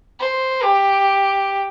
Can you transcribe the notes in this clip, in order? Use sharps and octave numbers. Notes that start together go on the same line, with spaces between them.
C5
G4